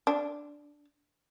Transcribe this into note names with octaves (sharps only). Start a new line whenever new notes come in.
D4